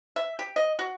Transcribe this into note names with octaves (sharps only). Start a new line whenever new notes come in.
E5
G4
D#5
F#4